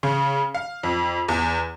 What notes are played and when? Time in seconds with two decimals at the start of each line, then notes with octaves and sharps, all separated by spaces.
0.03 C#3
0.55 F5
0.83 F2
1.28 E2